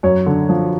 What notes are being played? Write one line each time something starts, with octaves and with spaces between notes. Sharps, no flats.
F#2 C#5
D3
F3